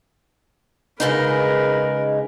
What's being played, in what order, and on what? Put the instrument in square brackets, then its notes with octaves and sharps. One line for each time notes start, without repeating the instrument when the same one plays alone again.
[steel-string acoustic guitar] C#3 G#3 D#4 [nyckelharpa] A#4 B4